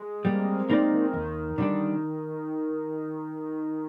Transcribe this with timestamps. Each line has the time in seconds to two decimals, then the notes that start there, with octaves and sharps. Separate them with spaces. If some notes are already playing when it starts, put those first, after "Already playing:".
Already playing: G#3
0.25 G3 A#3
0.32 C4
0.39 A#3
0.47 G#3
0.69 A#3 C4 D#4 A#4 D5
0.91 D#3
1.13 D#2 D#3
1.58 D3 G3 D4